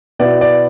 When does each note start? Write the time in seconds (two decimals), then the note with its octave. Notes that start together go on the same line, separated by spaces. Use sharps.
0.19 B2 B3 E4 D5
0.41 D5